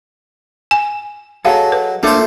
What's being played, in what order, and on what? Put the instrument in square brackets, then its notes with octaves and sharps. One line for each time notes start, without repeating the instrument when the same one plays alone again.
[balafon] G#5
[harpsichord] F#3 [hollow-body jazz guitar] G#4 A4 [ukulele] D#5 F5 F#5
[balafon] B4
[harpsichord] A3 C5 [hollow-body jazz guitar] A#3 F4 A4 [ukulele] D4